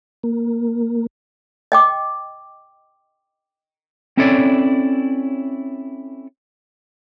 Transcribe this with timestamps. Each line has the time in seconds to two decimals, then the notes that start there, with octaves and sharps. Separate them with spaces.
0.23 A#3
1.72 D#5 G5 D6
4.17 C4 C#4 E4 A4 C#5 D5